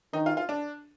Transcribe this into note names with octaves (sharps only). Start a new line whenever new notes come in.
D#3 D#4
F4
F4
D4